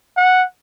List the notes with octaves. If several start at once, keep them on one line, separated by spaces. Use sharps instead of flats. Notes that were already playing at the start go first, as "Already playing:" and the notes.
F#5